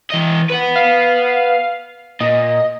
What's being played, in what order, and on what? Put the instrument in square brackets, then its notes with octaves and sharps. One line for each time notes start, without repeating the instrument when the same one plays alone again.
[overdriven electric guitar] E3 D#5
B4 F#5
[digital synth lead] F5
[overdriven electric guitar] A#2 [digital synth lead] D#5